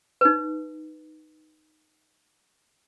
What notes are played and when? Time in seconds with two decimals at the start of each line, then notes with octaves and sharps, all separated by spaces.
0.21 D#4 B4